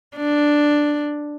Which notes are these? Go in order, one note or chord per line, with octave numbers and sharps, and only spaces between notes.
D4